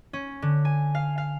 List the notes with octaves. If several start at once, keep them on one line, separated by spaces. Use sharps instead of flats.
C#4
D3
G#5
F5
F5